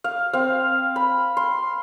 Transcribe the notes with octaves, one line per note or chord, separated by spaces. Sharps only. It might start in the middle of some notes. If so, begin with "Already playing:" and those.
F5
C4 F5
B5
C6